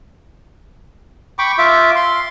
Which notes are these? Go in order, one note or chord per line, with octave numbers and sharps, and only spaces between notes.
G5 B5 C#6 D6
F4 E5 D6
C6